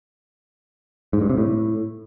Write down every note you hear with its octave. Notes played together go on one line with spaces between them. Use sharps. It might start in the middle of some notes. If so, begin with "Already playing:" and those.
G#2
G2
C3
A2